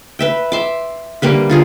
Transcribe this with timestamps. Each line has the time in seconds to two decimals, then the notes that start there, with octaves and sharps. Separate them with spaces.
0.19 B4 E5 G5
0.52 E5 C6 D6
1.22 D3 G3 A#3 B4
1.50 D3 F4 G#4